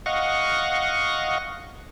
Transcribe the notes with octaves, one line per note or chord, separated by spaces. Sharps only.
D#5 F5 F#5 C#6